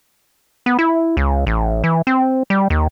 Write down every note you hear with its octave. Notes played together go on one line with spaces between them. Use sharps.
B3
E4
C#2
A1
E3
C4
G3
D#2